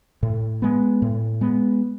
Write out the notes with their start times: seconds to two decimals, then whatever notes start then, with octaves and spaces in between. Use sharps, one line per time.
0.23 A2
0.62 G#3 B3
1.02 A2
1.41 G#3 B3